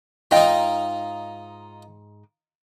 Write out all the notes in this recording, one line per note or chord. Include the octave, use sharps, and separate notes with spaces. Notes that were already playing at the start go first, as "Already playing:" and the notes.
G#2 D#4 F4 D#5 G5